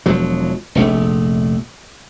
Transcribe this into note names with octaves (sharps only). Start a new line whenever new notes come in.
E1 F3 F#3
F1 A#1 A3